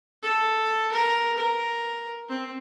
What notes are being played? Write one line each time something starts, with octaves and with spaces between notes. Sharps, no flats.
A4
A#4
A#4
C4